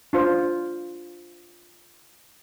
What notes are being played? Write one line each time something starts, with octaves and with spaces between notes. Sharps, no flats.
D4 F4 C5